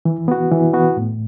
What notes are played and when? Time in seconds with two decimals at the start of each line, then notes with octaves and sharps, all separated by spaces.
0.05 E3
0.28 B3 F#4
0.51 E3
0.73 B3 F#4
0.97 A2